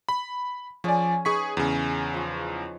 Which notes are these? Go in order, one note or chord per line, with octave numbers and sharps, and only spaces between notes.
B5
F3 C#4 G#4 D5 D#6
D#4 G#4 B4 A#5 C#6 B6
E2 C#3
F3 C#6